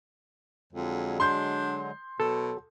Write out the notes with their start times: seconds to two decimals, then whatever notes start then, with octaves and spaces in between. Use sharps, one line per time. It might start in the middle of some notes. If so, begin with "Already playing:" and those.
0.73 F2 D3 F#3 G#3
1.20 D4 C6 G6
2.20 B2 F#3 A4